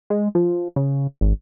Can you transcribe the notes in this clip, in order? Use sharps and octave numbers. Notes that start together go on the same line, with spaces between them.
G#3
F3
C#3
G#1